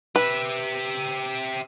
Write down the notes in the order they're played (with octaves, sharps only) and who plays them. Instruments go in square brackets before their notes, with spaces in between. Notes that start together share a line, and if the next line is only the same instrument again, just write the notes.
[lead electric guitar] G4 E5 [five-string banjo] B4